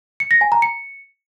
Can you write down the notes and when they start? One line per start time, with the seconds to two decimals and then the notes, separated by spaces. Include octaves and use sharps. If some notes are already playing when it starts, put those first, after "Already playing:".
0.20 C#7
0.31 A#6
0.41 G#5
0.52 A#5
0.62 C#7